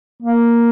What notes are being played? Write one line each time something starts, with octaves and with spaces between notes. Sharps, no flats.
A#3